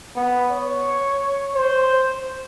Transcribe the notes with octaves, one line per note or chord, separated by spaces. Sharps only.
B3
C#5
C5